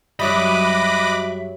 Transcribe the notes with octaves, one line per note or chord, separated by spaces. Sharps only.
F#2 F#3 G3 D#5 E5 B5 D6 F#6